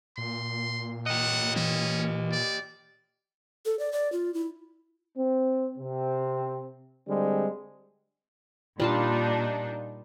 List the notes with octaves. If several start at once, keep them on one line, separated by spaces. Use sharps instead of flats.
A#2 C6
G4 D#5 F#5
E3 C#4
D5
A4
D5
D5
F4
E4
C4
C3 C4
D3 G3 G#3 C4
A#2 G3 D4 D#4 F4 A5